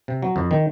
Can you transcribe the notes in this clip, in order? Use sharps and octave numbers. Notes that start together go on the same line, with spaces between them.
C3
F#3
F2
D#3